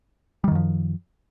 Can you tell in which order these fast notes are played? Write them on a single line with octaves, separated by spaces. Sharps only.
G3 D#3 F#2 F3